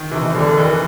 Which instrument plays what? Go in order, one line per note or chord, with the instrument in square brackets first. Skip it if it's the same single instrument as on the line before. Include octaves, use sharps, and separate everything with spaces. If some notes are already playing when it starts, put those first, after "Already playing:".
Already playing: [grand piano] D#3
[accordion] C3 [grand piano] E3
[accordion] B2
C3
[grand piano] F1 [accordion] D3
[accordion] D#3 [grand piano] E3